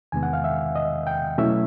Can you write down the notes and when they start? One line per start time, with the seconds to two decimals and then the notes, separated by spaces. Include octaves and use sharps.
0.12 E2 C3 D#3 G#3 B3 G#5
0.23 F#5
0.33 F5
0.44 E5
0.76 D#5
1.07 G5
1.38 B2 F#3 A3 C#4 E4 E5